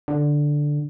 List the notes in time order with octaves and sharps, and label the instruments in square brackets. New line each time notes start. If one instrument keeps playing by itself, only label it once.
[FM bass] D3